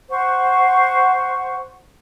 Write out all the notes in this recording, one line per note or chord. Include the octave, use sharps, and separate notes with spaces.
C5 F#5 C#6